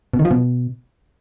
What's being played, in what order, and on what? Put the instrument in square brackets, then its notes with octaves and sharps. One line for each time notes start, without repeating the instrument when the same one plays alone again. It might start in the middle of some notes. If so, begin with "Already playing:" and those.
[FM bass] B2
D#3
F3
B2